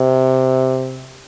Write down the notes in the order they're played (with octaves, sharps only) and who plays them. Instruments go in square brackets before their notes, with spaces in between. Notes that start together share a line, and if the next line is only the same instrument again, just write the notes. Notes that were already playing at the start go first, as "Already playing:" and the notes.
Already playing: [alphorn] C3